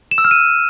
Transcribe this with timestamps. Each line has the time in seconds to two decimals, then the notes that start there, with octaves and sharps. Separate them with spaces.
0.11 E7
0.18 E6
0.25 F6
0.31 D#7